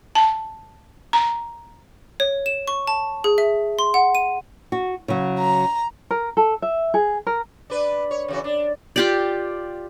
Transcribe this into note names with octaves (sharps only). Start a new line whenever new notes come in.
A5
A#5
C#5
E7
C#6
A5
G#4
E5
C6
F#5
D#7
F#4
C#3 F#3
A#5
A#4
A4
E5
G#4
A#4
D4 B4
C#5
C#3 E3 F#4
D4
F4 G4 D5